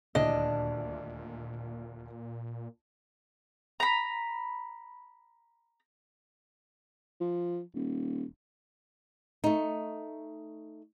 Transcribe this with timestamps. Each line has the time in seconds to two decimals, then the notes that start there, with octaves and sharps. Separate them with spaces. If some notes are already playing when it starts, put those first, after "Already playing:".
0.15 D#1 D2 A#2 D4 E4 D#5
3.80 A#5 B5
7.20 F3
7.75 D#1
9.44 A3 D#4